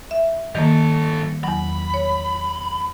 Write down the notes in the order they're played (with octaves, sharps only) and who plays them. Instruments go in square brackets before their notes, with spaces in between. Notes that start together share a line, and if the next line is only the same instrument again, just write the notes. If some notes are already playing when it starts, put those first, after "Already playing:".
[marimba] E5
[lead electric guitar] G2 A4 [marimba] D#3 A#3
[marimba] E2 F#3 [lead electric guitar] B5
[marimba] C#5